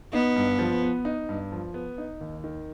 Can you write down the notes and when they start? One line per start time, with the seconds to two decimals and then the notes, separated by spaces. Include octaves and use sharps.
0.13 B3 D#4
0.36 G2
0.59 F3
0.82 B3
1.05 D#4
1.29 G2
1.52 F3
1.74 B3
1.98 D#4
2.21 D#2
2.44 D#3